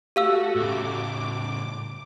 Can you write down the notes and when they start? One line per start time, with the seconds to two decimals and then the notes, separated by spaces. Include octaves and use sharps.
0.16 A3 F#4 G4 F5 E6
0.55 A2 C#3 D6